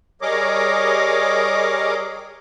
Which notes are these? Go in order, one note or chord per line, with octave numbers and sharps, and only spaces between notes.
G3 G#4 A#4 C#5 D#5 D6